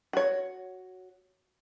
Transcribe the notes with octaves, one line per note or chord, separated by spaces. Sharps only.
F#4 C#5